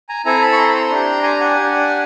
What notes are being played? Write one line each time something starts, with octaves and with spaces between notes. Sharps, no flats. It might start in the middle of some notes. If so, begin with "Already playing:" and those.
G#5 A#5
C4 E4 A4 G#5 A#5
A5 B5
C#6
A#5 C6
B5
A#5 C6
D4 G4
G#5 A#5
F#5 G#5
D4 G4